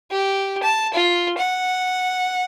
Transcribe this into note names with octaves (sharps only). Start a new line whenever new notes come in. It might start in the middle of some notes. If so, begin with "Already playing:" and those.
G4
A5
F4
F#5